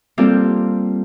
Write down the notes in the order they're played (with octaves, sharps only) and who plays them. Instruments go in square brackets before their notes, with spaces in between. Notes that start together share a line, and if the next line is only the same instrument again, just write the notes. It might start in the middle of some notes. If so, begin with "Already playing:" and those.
[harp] G3 A#3 C4 F4 G4 A4